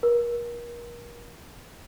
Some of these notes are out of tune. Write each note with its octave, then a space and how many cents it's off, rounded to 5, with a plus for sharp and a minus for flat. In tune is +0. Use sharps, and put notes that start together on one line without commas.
A#4 +35